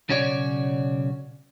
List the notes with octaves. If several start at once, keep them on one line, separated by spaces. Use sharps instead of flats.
B1 C#3 C#4 F#4 C#5 D5